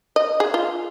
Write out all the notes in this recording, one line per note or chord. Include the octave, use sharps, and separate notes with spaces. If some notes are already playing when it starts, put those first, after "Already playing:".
D#5
G#4
F4